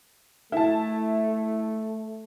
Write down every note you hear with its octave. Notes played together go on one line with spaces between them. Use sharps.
A3 E4 A5